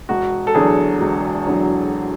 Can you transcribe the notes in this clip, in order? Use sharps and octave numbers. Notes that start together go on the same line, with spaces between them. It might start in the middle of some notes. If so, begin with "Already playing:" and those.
E1 F#4
A4
E2 D3 F#3 G#4
E1
E2 D3 F#3